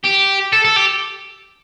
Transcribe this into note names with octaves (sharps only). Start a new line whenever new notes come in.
G4
A4
A4
G4